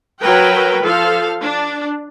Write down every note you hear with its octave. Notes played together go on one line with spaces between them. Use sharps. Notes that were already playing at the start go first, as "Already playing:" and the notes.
F#3 A#4 B4 G5
F3 A4 F5
D4